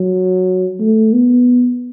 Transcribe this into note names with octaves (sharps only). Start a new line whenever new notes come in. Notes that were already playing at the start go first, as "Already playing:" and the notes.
Already playing: F#3
A3
B3